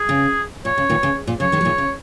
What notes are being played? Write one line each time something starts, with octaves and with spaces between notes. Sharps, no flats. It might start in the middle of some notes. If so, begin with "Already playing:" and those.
Already playing: G#4
C#3
A#2 C#5
C#3
A#2 D#3
C#3
A#2
C#3 F#3 C#5
D#3 G#3
F#3
A#2 D#3
C#3